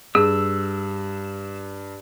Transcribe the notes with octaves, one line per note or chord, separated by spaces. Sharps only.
G2 G#4 E6